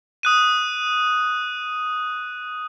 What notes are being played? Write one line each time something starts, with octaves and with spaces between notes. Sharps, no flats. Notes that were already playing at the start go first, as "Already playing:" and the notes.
D#6 F#6 D#7